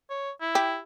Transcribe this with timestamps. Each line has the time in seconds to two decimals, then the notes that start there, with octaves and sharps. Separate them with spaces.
0.10 C#5
0.41 E4
0.55 G4